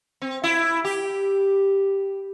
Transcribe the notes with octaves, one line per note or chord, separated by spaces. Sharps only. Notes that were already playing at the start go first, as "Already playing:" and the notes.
C4
E4
G4